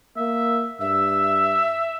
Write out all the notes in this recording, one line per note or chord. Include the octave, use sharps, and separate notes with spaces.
A#3 E5
G2 E5 E6